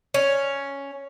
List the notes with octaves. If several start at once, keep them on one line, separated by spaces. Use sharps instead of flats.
C#4